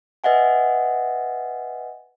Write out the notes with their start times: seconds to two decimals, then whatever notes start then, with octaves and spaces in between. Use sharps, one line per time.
0.24 B4 D#5 E5 F#5 G#5